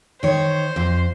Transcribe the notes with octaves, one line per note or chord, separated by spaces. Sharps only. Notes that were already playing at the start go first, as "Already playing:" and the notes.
D#3 C5 C#5
F2